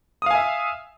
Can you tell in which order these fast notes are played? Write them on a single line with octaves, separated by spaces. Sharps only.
D#6 F5 G#5 E5